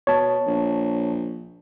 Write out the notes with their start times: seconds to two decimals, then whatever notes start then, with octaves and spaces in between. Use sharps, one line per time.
0.07 B2 C#5 A5
0.47 A#1